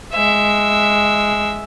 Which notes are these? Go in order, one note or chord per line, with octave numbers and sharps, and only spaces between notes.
G#3 E5